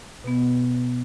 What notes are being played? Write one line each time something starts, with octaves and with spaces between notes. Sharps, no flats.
B2 B3